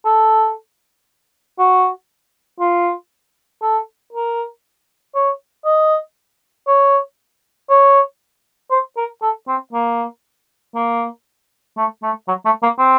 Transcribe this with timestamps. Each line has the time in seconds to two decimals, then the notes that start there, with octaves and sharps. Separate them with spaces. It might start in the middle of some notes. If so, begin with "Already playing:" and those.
0.05 A4
1.58 F#4
2.60 F4
3.62 A4
4.13 A#4
5.15 C#5
5.65 D#5
6.67 C#5
7.70 C#5
8.71 C5
8.97 A#4
9.22 A4
9.48 C4
9.73 A#3
10.75 A#3
11.77 A3
12.03 A3
12.28 F#3
12.45 A3
12.63 A#3
12.79 C4